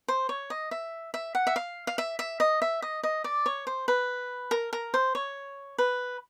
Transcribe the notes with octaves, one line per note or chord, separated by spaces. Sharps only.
C5
C#5
D#5
E5
E5
F#5
E5
F5
F5
E5
E5
D#5
E5
D#5
D#5
D5
C#5
C5
B4
A#4
A#4
C5
C#5
B4